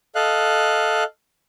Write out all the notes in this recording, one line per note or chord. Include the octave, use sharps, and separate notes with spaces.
A4 D#5 F5 F#6